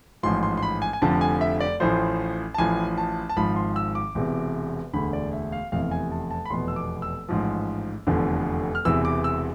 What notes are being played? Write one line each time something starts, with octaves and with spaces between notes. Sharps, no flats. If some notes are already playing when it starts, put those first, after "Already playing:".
A1 G#2 F3 C6
C6
C6
B5
G#5
G#5
F1 F2 D3 F3 A5
G#5
E5
D5
A1 A2 F3 C5
A5
A1 A2 F3 G#5
A5
A5
G#1 G#2 F3 B5
C6
E6
D6
E1 E2 C3
E1 D2 D3 B5
D5
E5
F5
F1 E2 C3 E3 F5
F5
G#5
A5
A5
B5
F1 E2 B2 C6
E6
D6
E6
A1 G#2 F3
F1 E2 D3 F3
F6
E1 E2 C3 E3 E6
D6
E6